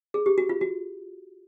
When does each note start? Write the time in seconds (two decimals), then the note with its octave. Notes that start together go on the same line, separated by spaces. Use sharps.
0.14 G#4
0.26 G4
0.38 F#4
0.49 F4
0.61 F#4